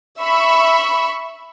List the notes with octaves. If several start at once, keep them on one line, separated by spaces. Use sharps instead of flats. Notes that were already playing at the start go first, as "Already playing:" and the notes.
E5 B5 C#6 E6